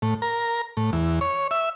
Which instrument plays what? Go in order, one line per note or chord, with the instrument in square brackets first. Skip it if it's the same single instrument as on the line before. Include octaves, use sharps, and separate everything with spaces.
[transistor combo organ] A2
A#4
A2
E2
C#5
E5